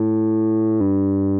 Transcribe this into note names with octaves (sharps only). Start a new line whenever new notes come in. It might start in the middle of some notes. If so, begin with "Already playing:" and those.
Already playing: A2
G2